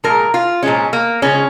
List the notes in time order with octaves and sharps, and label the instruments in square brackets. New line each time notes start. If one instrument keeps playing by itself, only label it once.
[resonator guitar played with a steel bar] A#2 F3 G#3 A#4
F4
A#2 F3 G#3 C#4
A#3
C#3 F3 G#3 C#4